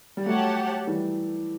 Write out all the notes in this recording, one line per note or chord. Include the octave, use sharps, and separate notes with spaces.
G3
F#3 A3 G4 C#5 F#5 A5
E3 G3